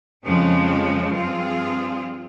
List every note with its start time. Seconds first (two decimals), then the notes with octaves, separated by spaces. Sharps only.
0.25 F2 C#3 F3 G#3
1.13 G2 F3 C4 F4 G#4